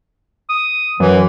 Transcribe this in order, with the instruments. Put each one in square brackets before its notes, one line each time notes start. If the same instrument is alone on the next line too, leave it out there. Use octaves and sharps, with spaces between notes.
[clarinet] D#6
[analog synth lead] F#2 [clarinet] E3